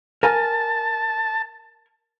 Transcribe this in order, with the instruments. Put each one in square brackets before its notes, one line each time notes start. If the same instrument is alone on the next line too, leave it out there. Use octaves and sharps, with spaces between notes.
[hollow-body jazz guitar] A#4 G#5 [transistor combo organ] A5